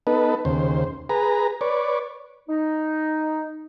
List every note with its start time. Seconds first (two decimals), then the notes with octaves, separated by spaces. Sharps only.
0.07 B3 D#4 A4 B4
0.45 D#2 C#3 C5
1.09 G#4 B4 A#5
1.61 B4 C#5 D5
2.49 D#4